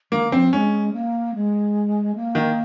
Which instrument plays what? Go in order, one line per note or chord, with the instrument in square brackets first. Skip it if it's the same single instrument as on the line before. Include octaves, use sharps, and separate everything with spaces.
[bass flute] D#3 [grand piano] A#3
[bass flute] F3 [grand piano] C4
[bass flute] G#3 [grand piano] C#4
[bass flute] A#3
G#3
A#3
[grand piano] D#3